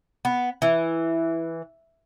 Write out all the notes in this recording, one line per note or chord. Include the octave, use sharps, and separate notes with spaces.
B3
E3